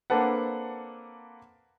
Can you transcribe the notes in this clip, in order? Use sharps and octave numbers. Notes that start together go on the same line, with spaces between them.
A#3 C4 D4 A4 B4 F#5